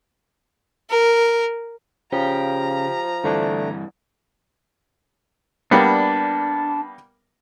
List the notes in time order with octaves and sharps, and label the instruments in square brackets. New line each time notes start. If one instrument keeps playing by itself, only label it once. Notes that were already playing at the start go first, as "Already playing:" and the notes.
[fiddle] A#4
[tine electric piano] C#3 [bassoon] F3 [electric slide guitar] G4 [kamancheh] A#5
[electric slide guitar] G2 E3 [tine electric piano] D3 A3 D4
[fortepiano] G3 A#3 B3 [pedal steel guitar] D4